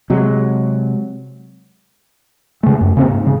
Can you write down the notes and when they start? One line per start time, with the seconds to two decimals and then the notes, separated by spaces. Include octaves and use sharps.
0.10 C3 F#3 G#3
2.63 C#3 A3
2.80 D1 F#2
2.97 C#3 A#3 C4
3.08 G#2
3.26 C#3